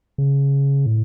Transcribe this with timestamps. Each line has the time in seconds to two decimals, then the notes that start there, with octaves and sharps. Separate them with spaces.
0.18 C#3
0.86 A2